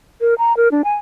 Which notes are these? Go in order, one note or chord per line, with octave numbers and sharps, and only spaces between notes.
A#4
A#5
A#4
D4
G#5